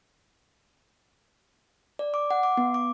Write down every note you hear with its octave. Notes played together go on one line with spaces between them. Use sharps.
D5
D6
F#5
D6
B3
D6